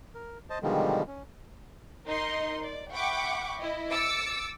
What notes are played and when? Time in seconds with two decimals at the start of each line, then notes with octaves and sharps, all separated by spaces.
0.15 A#4
0.50 C5 D#5 A5
0.63 B2 D3 D#3 F3 G3 G#3
1.07 C#4
2.06 D#4 A#4 D#5 C6
2.63 D5
2.92 E5 F#5 G5 B5 C#6 D6
3.59 E4 D#5
3.91 D6 E6 A6 C#7